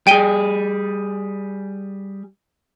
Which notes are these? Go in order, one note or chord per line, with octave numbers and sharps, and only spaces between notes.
G3 G#4 G5 D#7 G7